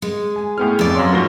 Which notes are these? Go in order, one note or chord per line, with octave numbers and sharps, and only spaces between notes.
G#3
G#5
A2 B3 G#4 G5 F6
F2 D5
F#2 C#5 F5 C6
G#2 F3 A#3 F#4 A#6 G7